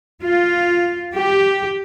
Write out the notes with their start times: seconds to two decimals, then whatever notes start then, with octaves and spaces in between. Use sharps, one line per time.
0.23 F4
1.15 G4